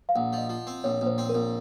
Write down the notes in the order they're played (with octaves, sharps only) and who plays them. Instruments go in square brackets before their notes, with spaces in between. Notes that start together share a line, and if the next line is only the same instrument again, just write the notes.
[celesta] F5
[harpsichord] A#1 [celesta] F#5
[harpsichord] F3
[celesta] D#5
[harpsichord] F3
C4
[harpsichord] A#1 [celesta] C#5
[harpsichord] A#1
[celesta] C5
[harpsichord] C4
[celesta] A#4
[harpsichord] A#1